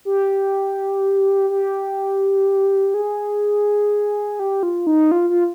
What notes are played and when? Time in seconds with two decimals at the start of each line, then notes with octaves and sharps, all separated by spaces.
0.05 G4
1.50 G4
2.94 G#4
4.39 G4
4.63 F4
4.87 D#4
5.12 F4
5.30 F4